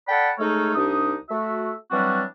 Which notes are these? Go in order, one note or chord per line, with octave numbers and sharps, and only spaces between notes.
A4 D5 F#5 G5 A5 B5
G#3 A3 D#4 A4 A#4 C#5
C2 D4 D#4 G4 D#6
A3 F#4 E5
E3 F#3 G3 C4 D4 F#4